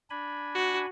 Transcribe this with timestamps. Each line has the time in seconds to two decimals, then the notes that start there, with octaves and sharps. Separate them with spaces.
0.10 D4 G#5 B5
0.55 F#4